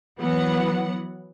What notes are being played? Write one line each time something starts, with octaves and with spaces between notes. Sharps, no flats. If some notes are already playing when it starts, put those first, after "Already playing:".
E3 F#3 B3 F#5